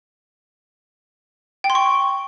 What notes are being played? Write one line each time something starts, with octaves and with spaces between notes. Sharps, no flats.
G5
C6
C#6